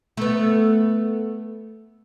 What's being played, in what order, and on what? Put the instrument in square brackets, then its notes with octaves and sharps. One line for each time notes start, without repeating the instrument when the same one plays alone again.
[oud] A3 B3